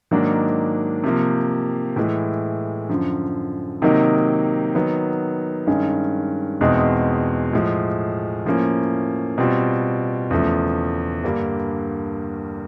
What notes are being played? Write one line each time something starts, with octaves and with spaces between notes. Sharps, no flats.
G#2 D#3 F#3 A#3 D4
C3 F3 A#3
A2 E3 G#3
F#2 D3 F3
C3 D#3 F#3 A#3 D#4
D#3 F#3 B3
G2 D#3 G#3 C#4
E2 B2 G#3 C4 D#4
A2 F3 G#3
A2 F3 A#3 C#4
B2 G3 C4 F4
E2 C#3 F3 A3
G2 D3 G3 A#3